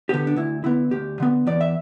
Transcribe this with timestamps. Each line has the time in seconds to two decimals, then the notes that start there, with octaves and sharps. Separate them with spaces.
0.09 D3 B3 G4
0.27 D4
0.36 D2 E4
0.64 D3 B3 E4
0.91 D2 G4
1.20 D3 B3
1.47 E2 D5
1.61 E5